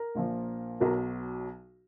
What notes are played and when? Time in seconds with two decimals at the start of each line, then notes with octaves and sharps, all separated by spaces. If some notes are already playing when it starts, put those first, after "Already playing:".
Already playing: A#4
0.15 A#1 A#2 F3
0.80 B1 B2 F#3 A#4